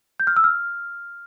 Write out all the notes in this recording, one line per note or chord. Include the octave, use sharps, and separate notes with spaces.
G6
F6
E6
F6